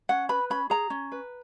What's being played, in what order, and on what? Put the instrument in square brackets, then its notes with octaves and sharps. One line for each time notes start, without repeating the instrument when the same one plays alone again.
[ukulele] C#4 F#5
B4 B5
C#4 B5
G#4 A#5
C#4
B4